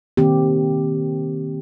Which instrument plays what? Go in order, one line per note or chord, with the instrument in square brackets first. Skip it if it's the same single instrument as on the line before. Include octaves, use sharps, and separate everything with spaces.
[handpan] D#3 A#3 C4 G4